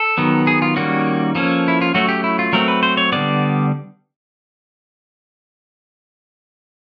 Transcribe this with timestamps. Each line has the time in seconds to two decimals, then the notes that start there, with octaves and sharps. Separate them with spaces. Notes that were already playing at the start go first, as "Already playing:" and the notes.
Already playing: A4
0.18 D#3 F#3 B3
0.47 G#4
0.62 F4
0.76 D#3 G3 A#3 C#4 F#4
1.35 F3 A#3 C#4 A4
1.68 E4
1.81 F4
1.94 F#3 A3 C#4 F#4
2.09 G4
2.24 E4
2.39 F4
2.53 F#3 A3 C4 A#4
2.68 B4
2.83 C5
2.97 C#5
3.12 D3 G3 B3 D5